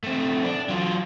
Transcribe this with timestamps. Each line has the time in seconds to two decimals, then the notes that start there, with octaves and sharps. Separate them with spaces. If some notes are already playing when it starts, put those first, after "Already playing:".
0.04 A3 C4
0.45 D4
0.69 F#3 F4